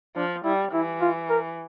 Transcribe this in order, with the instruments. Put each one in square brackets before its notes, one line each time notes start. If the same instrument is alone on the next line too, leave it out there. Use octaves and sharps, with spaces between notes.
[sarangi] F3 [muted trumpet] D4
[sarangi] G3 [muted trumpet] E4
[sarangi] E3 [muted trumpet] E4
[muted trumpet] F4
A#4